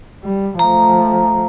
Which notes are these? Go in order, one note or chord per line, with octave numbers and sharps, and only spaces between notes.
G3
F3 A3 A#5